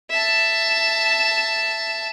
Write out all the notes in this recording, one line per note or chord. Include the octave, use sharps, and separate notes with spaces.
E5 A5